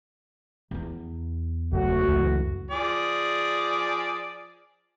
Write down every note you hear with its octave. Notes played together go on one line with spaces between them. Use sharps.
E2 B3
F#1 F#2 A3 F#4
C#2 F#2 E3
F3 G#4 D5